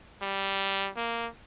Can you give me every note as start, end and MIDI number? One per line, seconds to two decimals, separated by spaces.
0.22 0.90 55
0.96 1.29 58